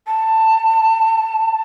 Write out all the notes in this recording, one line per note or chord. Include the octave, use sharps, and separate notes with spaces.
A5